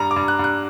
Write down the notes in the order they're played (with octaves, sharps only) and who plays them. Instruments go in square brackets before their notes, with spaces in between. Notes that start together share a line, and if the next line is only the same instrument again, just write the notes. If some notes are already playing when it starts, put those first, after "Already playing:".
Already playing: [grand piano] G2 A#5
D6
G2
F#6
G2
F#6